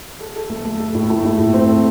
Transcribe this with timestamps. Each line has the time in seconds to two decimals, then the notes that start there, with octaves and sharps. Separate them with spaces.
0.20 A4
0.36 A4
0.50 A3
0.65 A3
0.80 A4
0.95 A2
1.10 A3
1.25 A2
1.39 A2
1.54 C4
1.69 A4